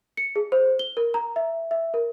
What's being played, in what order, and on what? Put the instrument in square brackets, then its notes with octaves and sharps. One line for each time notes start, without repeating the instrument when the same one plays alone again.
[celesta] C#7
G#4
C5
G7
A#4
A#5
E5
E5
A#4